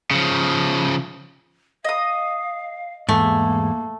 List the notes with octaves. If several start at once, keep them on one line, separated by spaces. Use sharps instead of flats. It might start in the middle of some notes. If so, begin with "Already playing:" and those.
C#3 F3
D#5 F5 D#6
E2 G#2 A3 A#3